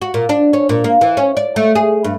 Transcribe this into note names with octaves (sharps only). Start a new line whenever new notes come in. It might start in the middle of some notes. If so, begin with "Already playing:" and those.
F#4
A#2
D4
C#4
A#2
A#3
E3
C#4
D5
A3
G#4
G2